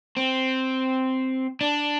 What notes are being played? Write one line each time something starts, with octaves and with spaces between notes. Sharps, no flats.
C4
D4